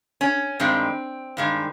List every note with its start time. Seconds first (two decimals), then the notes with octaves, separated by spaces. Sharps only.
0.21 C#4
0.60 G2 D#3 G#3 C4
1.37 G2 D#3 G#3